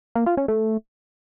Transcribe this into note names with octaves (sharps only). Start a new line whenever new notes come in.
A#3
F4
C#4
A3